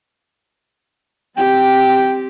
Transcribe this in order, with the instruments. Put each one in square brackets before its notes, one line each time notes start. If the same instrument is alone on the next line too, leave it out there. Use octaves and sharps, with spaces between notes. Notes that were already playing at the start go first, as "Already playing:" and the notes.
[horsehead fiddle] C4 G4 [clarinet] G5